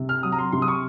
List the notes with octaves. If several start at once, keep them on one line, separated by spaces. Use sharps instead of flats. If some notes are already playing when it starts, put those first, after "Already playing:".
Already playing: C3
F6
F#3 D#6
A#5
C6
C3 C6
D#6
C#6